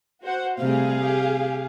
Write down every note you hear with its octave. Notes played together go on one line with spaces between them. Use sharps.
F#4 C5 F#5
C3 G3 A3 G#4 F5
G4